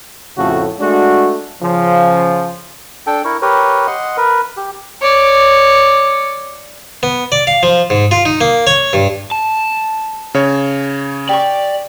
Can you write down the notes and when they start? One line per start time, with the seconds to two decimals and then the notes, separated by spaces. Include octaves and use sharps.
0.37 F2 A2 C#3 A3 F#4
0.80 G#3 A3 D4 F#4
1.61 C#3 F3
3.07 D4 A4 G5
3.25 E4 A#4 C#6
3.42 G4 A#4 B4 C#5
3.87 D#5 F#5 C6
4.17 A#4 B4
4.57 G4
5.01 C#5 D5
7.03 B3
7.32 D5
7.47 F5
7.63 F3
7.90 G#2
8.11 F4
8.25 D#4
8.41 A#3
8.67 C#5
8.93 G2
9.31 A5
10.34 C#3 C#5
11.29 G4 D5 G5 C#6